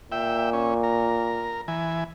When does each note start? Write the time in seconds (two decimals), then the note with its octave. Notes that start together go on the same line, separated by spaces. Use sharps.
0.12 A#2 E5 G5
0.53 C#4
0.83 A#4
1.68 E3 G#5